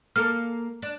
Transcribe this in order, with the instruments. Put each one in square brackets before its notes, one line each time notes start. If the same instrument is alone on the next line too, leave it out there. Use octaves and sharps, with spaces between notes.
[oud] A#3 A4 A#4 [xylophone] F6
[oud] D4